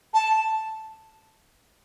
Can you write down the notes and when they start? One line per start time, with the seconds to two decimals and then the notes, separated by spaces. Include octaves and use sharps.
0.14 A5